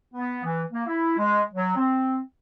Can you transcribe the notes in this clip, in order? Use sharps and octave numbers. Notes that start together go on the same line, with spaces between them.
B3
E3
A#3
E4
G#3
F#3
C4